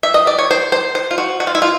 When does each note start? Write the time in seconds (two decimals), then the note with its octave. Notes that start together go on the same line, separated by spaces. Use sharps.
0.03 E5
0.14 D#5
0.27 D5
0.39 C#5
0.51 C5
0.72 C5
0.95 C5
1.11 F4
1.18 F#4
1.40 F#4
1.47 F4
1.55 E4
1.62 F4